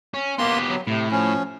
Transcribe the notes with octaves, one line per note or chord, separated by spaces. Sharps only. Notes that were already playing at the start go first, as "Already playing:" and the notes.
C#4
A#3 B3 G4 C6
F#3
A2 C3
F3 C#4